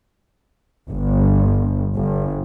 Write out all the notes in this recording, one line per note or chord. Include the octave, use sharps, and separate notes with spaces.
G1
G1